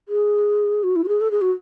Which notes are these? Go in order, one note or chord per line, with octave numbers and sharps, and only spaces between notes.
G#4
F#4
E4
F#4
G#4
A4
G#4
F#4